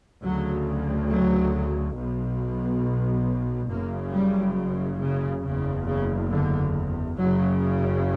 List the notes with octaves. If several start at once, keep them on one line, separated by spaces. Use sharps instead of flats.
D2 C#3 F#3
F#3
B1 B2
F#1 F#2 C#3 A#3
G3
C#3
F#1 E2 C#3
C#3
D3
F#1 F#2 C#3 F#3